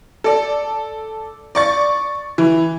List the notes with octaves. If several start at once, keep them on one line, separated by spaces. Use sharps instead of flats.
A4 D5
D5 C#6 A6
E3